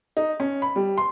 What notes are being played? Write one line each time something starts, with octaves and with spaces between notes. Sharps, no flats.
D#4
C#4
B5
G3
C6